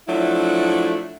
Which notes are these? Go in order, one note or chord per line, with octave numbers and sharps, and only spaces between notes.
F3 F#3 A3 D4 E4